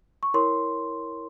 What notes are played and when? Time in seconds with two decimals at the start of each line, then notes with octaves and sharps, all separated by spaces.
0.23 C#6
0.34 E4 A#4 C#5 C6